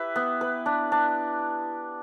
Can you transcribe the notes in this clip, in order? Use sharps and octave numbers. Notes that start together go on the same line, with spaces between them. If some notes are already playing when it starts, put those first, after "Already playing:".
Already playing: E4 G4 B4 E5
B3
B4
D4
D4